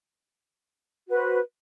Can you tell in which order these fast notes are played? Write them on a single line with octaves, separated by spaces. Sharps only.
F#4 B4 C5